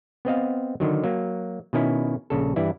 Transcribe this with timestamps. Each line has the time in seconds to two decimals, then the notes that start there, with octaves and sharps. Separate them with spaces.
0.25 B3 C4 D#5 F5
0.80 D3 D#3 F#3
1.04 F#3 A#3
1.73 B2 D#3 C#4 E4
2.30 A#1 C#3 A4
2.56 G2 E3 E4 D5